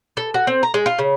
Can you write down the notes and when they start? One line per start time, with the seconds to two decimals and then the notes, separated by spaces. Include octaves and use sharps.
0.17 A4
0.34 F#4
0.47 C4
0.63 A#5
0.74 G#3
0.86 F4
0.99 C#3